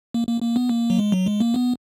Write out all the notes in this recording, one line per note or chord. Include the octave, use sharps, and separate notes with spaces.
A#3
A#3
A#3
B3
A#3
F#3
G#3
F#3
G#3
A#3
B3